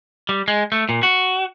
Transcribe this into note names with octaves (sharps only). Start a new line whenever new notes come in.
G3
G#3
A3
A#2
F#4